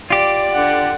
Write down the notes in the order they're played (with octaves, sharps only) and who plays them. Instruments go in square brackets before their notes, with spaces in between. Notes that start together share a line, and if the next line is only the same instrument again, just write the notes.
[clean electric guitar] F4 G4 [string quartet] D5
[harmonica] D3 F#5